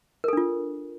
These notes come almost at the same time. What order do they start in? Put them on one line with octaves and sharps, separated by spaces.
A#4 A4 D4 F4